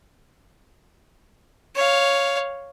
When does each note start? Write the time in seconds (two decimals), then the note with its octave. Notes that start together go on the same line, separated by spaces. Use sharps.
1.75 C#5 F5